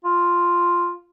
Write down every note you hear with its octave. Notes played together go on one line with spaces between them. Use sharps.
F4